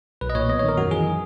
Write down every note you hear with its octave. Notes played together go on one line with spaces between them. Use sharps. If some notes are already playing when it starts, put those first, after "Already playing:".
B1 B4
D#5
A#2 C#5
B3 D#5
D#3 C#5
A#4
F#2 F#4
E3 G#4